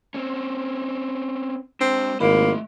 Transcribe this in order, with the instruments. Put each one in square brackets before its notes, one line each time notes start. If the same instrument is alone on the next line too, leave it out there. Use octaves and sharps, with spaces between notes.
[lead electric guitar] C4 C#4
[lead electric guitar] G#3 D4 [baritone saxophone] C4
[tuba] G#1 [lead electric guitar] A3 D#5 [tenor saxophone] A#3 [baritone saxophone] E4